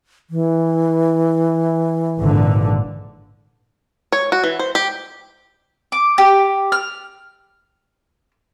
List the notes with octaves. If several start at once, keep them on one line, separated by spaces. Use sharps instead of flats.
E3
G#1 A#2 D3
C#5
F#4
E3
C5
G4
D6
G4
F6